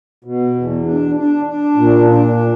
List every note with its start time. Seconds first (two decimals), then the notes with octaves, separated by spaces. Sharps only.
0.24 B2
0.55 E2
0.85 D4
1.15 D4
1.46 D4
1.76 A#2
2.07 D4
2.37 A#2